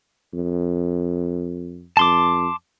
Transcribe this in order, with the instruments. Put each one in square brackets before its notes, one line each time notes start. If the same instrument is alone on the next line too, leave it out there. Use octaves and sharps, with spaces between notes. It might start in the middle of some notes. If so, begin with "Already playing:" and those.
[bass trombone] F2
[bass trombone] F2 [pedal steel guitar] A5 C6 D6